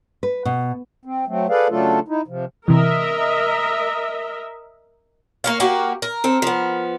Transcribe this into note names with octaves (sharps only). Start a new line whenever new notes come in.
B4
B2
C4
F#3 A3 C4
G#4 A4 B4 D5 F5
C#3 F#3 A3 D4 F4 A4
D#4 E4
C3 F3
C3 E3 A#4 D#5 E5
A#3 C#5 F5
A#3 F#4 G4
A#4
C4 A4
F3 B3